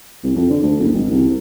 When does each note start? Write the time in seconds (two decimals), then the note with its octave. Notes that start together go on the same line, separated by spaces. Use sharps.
0.24 C2
0.35 F2
0.50 D3
0.63 D2
0.80 F#1
0.94 G#1
1.11 C2